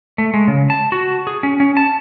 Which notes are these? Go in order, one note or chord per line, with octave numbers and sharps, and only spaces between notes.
A3
G#3
C#3
A5
F#4
G#4
C#4
C#4
A5